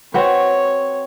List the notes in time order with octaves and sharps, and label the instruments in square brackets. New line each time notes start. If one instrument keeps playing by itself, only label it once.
[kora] C4 F#4 B4 [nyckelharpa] C#5